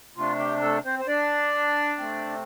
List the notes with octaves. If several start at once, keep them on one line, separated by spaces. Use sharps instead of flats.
C3 A3 D4 F4
G4
A3 A4
C4 C5
C5
D4 D5
C3 A3 C4